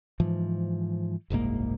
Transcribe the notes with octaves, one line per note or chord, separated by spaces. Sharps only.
G#2 E3 F3
F#1 C2 G#2 A#3